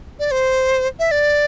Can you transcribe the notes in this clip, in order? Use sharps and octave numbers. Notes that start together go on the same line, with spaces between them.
D5
C5
E5
D5